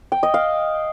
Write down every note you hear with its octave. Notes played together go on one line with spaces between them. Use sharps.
G5
D#5
F5